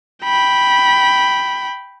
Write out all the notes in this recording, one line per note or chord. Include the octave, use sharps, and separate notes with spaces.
G5 B5